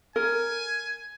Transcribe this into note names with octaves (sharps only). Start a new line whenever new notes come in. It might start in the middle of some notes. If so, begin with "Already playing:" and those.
A#4 G#5